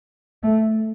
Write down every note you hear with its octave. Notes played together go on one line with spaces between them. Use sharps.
A3